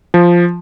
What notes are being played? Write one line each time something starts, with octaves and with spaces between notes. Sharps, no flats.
F3